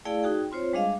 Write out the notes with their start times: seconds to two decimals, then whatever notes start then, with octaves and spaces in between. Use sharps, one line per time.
0.05 A3 E4 G#4 D5 F5 G5
0.23 D#4 F#4 G#4 G5
0.52 C4 F4 C5 C#5
0.73 G3 G#3 D4 G#4 D#5 F5